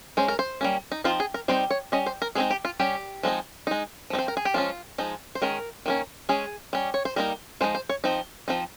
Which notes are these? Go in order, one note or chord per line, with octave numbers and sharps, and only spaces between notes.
G#3 C#4 C5
A#4
C5
G3 A#3 C#4
D#4
F3 C4 D#4 F4
G#4
A#4
G3 C4 D#4 C5
C#5
G3 C#4 D#5
C5
A#4
G#3 C4 D#4 G#4
G4
F4
G3 C#4 G4
F3 G#3 C4 D#4
G#3 D#4
F3 C4 D#4
C5
A#4
G#4
G4
F3 G#3 C#4 F4
F3 G#3 D#4
C5
D#3 G#3 C#4 A#4
D#3 A#3 C#4
G#3 C#4 G#4
G3 C#4
C#5
C5
G3 A#3 D#4 A#4
F3 G#3 D#4 C5
C5
C#5
F3 C4 D#4
F3 C4 D#4